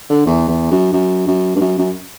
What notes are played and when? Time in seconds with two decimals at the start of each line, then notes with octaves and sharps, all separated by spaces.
0.09 D3
0.26 E2
0.48 E2
0.71 F#2
0.93 F#2
1.27 F#2
1.56 G2
1.61 F#2
1.78 F#2